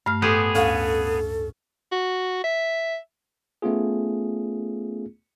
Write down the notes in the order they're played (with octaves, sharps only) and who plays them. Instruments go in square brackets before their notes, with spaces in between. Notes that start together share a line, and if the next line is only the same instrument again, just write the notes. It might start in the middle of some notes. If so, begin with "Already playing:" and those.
[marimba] G2 A3 F6 [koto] F5
[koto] A2 G4 C5 [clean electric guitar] B3 G#4
[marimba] D2 F5 [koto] C#4 [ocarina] A4
[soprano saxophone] F#4
E5
[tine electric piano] A3 B3 C#4 F4 G#4